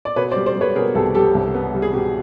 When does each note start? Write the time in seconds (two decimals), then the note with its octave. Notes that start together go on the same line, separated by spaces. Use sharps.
0.05 D5
0.16 B2 B4 C#5
0.31 C5 D5
0.36 G3
0.46 C5 D5
0.56 G3
0.61 B4 C#5
0.76 B2 G#4 A#4
0.95 C2 G4 A4
1.15 G3 G4 A4
1.35 C2
1.54 B3
1.74 G3
1.82 G#4
1.93 B2 G4